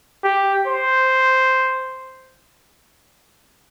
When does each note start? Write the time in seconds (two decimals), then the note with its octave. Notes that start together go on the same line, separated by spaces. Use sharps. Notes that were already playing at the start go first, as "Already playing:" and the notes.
0.24 G4
0.67 C5